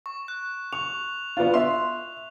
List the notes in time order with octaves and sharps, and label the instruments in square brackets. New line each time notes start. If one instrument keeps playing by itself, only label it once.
[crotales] C#6
F#6
[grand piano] C#6 [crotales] F7
[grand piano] B3 D4 F4
E5 C6